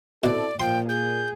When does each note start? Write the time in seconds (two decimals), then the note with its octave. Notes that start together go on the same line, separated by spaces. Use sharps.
0.24 B2 C4 E4 A4 D5
0.60 A#2 F3 G5 C6
0.89 G#4 G6